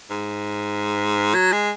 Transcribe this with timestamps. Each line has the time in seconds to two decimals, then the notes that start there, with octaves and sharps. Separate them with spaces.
0.11 G#2
1.35 F#3
1.52 G#3